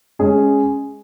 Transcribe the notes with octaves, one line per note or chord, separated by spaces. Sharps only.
G#3 C#4 G#4